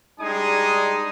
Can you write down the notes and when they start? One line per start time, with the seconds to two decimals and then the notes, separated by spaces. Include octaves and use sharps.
0.20 G3 G#3 D4 D#4 G#5 D#6